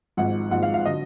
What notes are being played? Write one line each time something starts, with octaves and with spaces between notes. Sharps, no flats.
G#1 G#2 F3 F#5
G#1 G#2 F3 F#5
F5
F5
D3 F#3 D#5